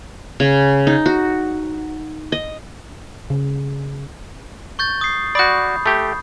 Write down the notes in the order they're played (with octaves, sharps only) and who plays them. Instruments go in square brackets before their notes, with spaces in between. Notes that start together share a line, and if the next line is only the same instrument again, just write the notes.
[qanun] C#3
D#4
F#4
D#5
[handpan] C#3
[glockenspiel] C#6 G6 A6
D#6 C7
[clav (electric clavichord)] F#4 D5 [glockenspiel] B5 D#6 G6
[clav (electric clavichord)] A3 G4